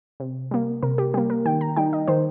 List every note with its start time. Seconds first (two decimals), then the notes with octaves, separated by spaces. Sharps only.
0.20 C3
0.51 G3 A#3
0.83 C3 A#4
0.98 G4
1.14 G3 A#3 G4
1.30 A#4
1.46 D#3 G5
1.61 A#5
1.76 G3 D#4 G5
1.93 D#5
2.07 D#3 C5